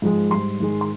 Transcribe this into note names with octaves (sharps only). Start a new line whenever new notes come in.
G#2 F3 G#3
G#2 G3 C6
G#2 D#3 G#3
C6